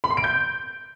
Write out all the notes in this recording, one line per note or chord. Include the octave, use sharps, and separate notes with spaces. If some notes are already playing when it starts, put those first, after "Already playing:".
B5
C6
D7
G6